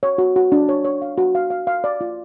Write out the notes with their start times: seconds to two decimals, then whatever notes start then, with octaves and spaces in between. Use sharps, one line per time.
0.03 C#5
0.18 F#4
0.36 F#4
0.52 D4
0.69 C#5
0.84 C#5
1.02 F5
1.18 F#4
1.35 F5
1.50 F5
1.67 F5
1.84 D5
2.01 F4